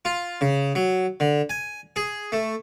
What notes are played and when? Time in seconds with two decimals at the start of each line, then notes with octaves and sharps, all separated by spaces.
0.05 F4
0.41 C#3
0.75 F#3
1.20 D3
1.50 G#5
1.96 G#4
2.32 A3